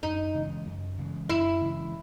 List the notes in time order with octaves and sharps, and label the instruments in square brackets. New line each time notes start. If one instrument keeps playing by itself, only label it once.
[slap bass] F#2 [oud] D#4
[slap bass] C#3 E3 G#3
F#2
C#3 E3 G#3
[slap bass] F#2 [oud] E4
[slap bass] C#3 E3 G#3